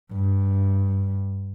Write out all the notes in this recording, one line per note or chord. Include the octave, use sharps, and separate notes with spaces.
G2